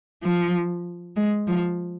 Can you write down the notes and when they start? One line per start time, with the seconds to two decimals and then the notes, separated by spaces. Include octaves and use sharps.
0.23 F3
1.16 G#3
1.47 F3